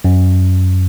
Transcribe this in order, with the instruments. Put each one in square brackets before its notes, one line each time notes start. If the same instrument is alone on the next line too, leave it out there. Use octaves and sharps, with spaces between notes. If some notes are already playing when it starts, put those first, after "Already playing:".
[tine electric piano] F#2